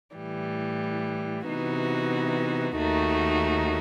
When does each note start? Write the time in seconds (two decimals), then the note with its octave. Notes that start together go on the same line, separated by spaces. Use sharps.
0.17 A2 E3 G3
1.46 C3 E3 B3 D#4 F#4
2.77 D#2 D#3 A3 D#4 F#4